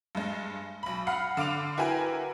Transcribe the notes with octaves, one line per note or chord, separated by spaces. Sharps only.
G2 G#3
B1 B5
F5 F#5 B5 F6
D3 F5 D6 D7 F7
E4 F#4 A#4 B4 G5 G#5